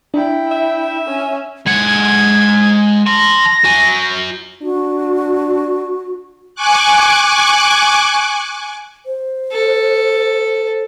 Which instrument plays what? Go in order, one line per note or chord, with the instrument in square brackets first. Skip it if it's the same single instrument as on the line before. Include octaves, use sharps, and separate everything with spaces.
[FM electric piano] D4 [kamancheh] E4 G5
[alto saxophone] E5
[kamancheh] C#4 G#5
[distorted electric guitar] G#3 F#5 [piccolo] G#6
[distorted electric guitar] A5 C6 [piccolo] A#6
[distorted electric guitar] F#4 G#5
[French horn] D4 [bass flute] F#4
[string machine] G#5 C#6 D6 F#6
[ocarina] C5
[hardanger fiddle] A4